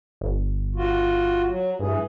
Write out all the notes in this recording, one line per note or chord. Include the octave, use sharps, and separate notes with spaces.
G1
F4 F#4
F#3
G2 E3 G#4